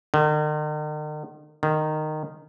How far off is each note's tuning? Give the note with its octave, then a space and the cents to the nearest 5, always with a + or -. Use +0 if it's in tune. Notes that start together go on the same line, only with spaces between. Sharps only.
D#3 -45
D#3 -15